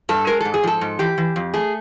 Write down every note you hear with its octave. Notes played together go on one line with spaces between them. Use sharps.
G2 A4
G#3 A#4
G#2 A4
G#4
F3 A4
G#2
E3 G4
E3
F2
A3 G#4